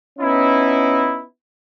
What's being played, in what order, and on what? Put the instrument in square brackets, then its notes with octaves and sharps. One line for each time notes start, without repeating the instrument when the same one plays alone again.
[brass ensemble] B3 C#4 D#4 E4